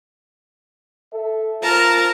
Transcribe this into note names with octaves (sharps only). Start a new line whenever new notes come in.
A4 E5
F4 A#4 C5 A5 A#5